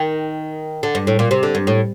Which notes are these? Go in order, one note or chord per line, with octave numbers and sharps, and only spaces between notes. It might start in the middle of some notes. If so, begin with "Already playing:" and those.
Already playing: D#3
D3
G2
A2
A#2
C3
D3
G2
A2